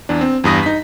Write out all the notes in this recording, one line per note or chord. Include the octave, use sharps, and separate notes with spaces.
E2 D4
C4
E2 G2 D#6 A#6
D#4 B6